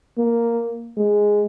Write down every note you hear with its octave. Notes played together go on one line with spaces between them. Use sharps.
A#3
G#3